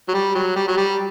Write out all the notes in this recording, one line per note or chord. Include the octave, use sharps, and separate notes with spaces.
F#3
G3
F#3
G3
F#3
G3